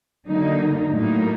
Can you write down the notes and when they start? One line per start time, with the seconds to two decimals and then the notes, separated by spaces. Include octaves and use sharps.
0.27 D3 F#3 A#3 D#4
0.91 A2 F#3 A#3 D#4